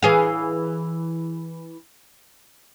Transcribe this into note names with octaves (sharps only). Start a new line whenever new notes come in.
E3 G#4 F5